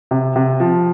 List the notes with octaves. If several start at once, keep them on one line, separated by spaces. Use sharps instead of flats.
C3
C3
F3